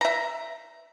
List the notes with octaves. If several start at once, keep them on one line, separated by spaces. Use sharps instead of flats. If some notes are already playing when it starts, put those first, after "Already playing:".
E5 A#5